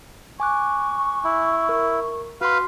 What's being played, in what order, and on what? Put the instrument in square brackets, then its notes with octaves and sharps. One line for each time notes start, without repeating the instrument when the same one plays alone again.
[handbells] G#5 D6 F#6 [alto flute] C#6
[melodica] E4
[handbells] A#4
[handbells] F#4 C6 [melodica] B4 F5